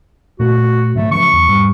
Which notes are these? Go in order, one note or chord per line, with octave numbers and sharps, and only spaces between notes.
A#2 A3 F#4
G#2 D3 F#3 A3
C#3 F3 F#3 C#6
E2
E1 G#2 G3